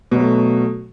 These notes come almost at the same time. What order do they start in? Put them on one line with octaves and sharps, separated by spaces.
B2 F#3 A3